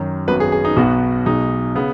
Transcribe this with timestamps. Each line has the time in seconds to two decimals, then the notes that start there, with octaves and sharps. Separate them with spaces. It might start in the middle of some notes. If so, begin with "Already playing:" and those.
Already playing: F#2 D#3 F#3
0.28 G#1 F#2 F#3 B3 B4
0.40 G#4
0.52 G#4
0.65 D#4
0.76 B1 B2 B3 F#4
1.26 B1 B2 G#3 D#4
1.75 C#3 B3